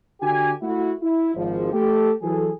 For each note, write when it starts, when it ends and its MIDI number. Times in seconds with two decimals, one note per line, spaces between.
0.21 0.52 50
0.21 0.52 66
0.21 0.52 67
0.21 0.52 80
0.62 0.92 57
0.62 0.92 64
0.62 0.92 66
1.03 1.33 64
1.35 1.73 32
1.35 1.73 53
1.73 2.11 57
1.73 2.11 67
1.73 2.11 69
2.22 2.49 52
2.22 2.49 54
2.22 2.49 68
2.22 2.49 69